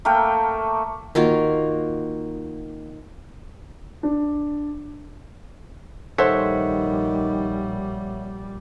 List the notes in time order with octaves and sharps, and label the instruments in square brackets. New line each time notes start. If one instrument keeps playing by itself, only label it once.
[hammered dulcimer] A3 A#3 A#4 G5
[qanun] D#3 A#3 F4 F#4
[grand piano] D4
[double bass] A#1 G3 [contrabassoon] D#3 [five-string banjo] A4 C5 [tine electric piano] C#5 E5 F#5